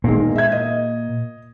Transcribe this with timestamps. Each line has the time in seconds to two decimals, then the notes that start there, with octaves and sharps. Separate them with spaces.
0.04 E1 A#2 D#3 G#3 A#3
0.35 E5 G#6
0.52 D#5